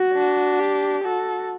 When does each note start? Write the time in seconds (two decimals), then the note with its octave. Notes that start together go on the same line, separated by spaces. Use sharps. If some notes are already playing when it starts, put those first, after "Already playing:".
Already playing: F#4
0.14 D4
0.59 G4
1.05 F#4 A4